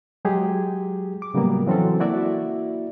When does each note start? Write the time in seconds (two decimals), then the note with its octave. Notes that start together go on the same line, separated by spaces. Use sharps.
0.25 F#3 G#3 G4 G#4
1.22 D6
1.34 A2 C#3 F#3 G3 A#3 B3
1.67 E3 F#3 C4 C#4 A4
2.00 A#3 E4 F#4 D5 E5